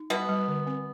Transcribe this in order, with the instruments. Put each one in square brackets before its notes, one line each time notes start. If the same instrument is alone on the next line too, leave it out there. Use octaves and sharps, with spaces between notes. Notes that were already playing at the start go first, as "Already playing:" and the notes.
Already playing: [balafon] D#4
[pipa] B2 B3 [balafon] G3
[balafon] G3
D3
C4